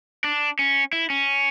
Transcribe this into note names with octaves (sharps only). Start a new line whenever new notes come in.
D4
C#4
E4
C#4